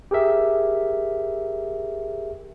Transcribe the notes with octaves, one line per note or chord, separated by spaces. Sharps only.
G4 G#4 A#4 E5